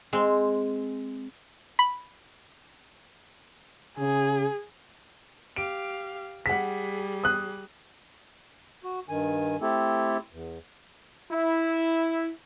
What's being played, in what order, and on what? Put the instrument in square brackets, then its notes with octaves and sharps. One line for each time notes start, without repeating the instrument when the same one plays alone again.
[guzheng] G#3 C4
[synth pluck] B5
[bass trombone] C#3 [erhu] G#4
[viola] G4 F5 [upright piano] D7
[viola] G3 G#4 [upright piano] F#5 B6
[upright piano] D#6 F#6
[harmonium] F#4
G2 D#3 G#5
A3 C4 E4 G4 A4
E2
[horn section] E4